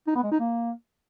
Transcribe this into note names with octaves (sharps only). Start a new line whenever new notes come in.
D#4
B3
G#3
D#4
A#3